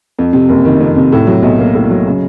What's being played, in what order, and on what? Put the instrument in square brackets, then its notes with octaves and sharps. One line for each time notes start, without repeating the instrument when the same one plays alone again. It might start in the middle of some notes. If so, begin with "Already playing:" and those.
[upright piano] F2
C3
F#1
D#3
F2
C3
A2
F#3
B1
A#3
A2
F#3
C#3